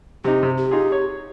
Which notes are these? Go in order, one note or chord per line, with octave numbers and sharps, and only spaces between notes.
C3 D#4 G4
C3
G4
D#4 F4 G#4
C#5